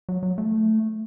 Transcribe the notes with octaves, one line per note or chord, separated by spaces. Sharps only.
F#3
F#3
A3